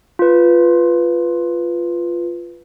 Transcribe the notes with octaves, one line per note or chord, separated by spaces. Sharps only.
F4 B4